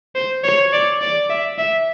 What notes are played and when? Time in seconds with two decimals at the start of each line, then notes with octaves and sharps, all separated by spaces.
0.15 C5
0.44 C#5
0.73 D5
1.01 D5
1.30 E5
1.58 E5